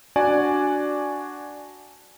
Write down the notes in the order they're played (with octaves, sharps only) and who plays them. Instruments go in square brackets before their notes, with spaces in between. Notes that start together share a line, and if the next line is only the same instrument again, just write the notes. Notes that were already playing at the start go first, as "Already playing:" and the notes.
[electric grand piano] D4 F#4 D5 G#5